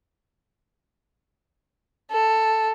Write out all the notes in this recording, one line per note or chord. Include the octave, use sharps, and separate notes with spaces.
A4